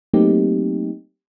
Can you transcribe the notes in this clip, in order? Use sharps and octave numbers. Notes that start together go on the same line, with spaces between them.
F#3 A3 A#3 C4 D#4 G4